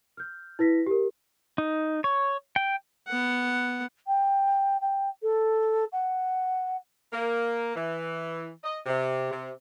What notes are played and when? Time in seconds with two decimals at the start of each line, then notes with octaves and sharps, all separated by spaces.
0.17 F6 G6
0.59 E4 B4 A#6 B6
0.87 G4 A#4
1.58 D#4
2.04 C#5
2.56 G5
3.08 B3 F#5
4.07 G5
4.81 G5
5.22 A4
5.92 F#5
7.12 A#3
7.75 E3
8.64 D#5
8.86 C3
9.32 C3